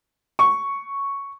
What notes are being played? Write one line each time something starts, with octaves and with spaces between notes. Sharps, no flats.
C#6